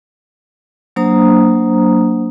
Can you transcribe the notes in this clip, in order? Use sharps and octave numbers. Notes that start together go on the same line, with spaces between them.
F#3 A#3 D4 C5 A#5 D#6